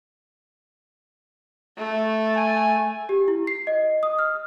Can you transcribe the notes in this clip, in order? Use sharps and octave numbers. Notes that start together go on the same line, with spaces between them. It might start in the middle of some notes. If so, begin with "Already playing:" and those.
A3
G#5
G4
E4
C7
D#5
D#6
F6